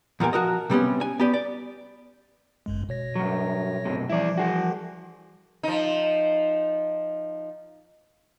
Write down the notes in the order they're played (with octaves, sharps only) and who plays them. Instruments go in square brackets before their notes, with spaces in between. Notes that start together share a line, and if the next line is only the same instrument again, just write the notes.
[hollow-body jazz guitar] E2 A#2 G3 A#4 G#5
F3 F#4 A#4 D#5
C3 G3 B3 C#4
G#5
B3 G4 D5
D5
[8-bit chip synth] G1 F#2 G#3
B2 C#5 A#6
[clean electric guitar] G2 F#3
B1 F#2 C3
[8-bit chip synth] E3 F3 G3 [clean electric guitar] E4 D5
[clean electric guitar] F#4 G#4
[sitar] F3 D#4